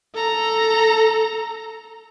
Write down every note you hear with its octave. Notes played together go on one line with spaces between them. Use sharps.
A4 A#5